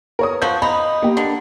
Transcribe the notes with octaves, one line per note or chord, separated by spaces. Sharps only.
A#4 C#5 D#6
F3 F#4 G6
D#4 B5
A#3 G4
D3